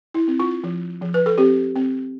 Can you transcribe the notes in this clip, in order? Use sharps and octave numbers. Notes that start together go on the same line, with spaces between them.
E4
C4
F4
F3
F3
B4
A4
C4 G4
C4